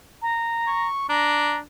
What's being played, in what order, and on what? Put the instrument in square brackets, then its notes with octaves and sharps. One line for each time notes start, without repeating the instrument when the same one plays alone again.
[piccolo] A#5
[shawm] C#6
[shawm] D4 [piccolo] A#5